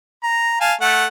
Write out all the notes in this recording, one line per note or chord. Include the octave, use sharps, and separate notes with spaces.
A#5
F5 G#5 A5
A3 F#5